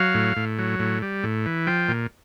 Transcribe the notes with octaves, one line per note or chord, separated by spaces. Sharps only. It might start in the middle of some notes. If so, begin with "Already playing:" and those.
Already playing: F#3 F5
A2
A2
F#3
A2
G3
A2
E3
F3 G5
A#2